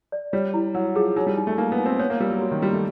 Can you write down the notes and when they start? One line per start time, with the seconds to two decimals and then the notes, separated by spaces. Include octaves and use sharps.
0.12 D5
0.33 G3 C#5
0.54 E4
0.75 F#3 F#5
0.95 F3 G#4
1.16 F#3 D#4
1.27 G3
1.37 D#4
1.47 A3
1.58 A#3 D#4
1.72 B3
1.79 D#4
1.86 C4
1.99 B3 C#5
2.10 A#3
2.20 G3 A#4
2.31 F#3
2.42 F#4
2.51 D#3
2.62 G3 F#4
2.73 A3